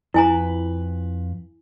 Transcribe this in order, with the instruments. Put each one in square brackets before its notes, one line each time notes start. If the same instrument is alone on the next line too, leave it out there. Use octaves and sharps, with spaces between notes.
[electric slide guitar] F2 B4 [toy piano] E4 G#5 A#5